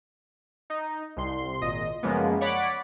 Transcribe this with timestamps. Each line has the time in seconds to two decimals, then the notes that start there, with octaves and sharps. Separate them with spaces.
0.70 D#4
1.17 C2 C6
1.61 G#1 A#2 D#5
2.03 F#2 C#3 F3 G#3 A#3 B3
2.41 C#5 D5 F#5 B5 D6